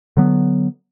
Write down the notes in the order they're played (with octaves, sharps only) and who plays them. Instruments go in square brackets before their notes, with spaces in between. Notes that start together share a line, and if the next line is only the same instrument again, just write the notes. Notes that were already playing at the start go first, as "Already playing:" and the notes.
[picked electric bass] D3 F#3 B3